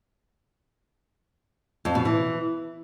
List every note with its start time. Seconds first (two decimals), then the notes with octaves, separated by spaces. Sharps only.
1.85 F2
1.95 B2
2.05 E3